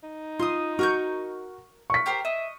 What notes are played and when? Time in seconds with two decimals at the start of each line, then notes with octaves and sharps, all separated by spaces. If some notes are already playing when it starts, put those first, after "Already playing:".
0.03 D#4
0.39 F4 C6 D#6
0.79 F#4 A#4 C#6 G6
1.90 C#6 B6
2.06 G4 A#4 C5
2.25 D#5 E5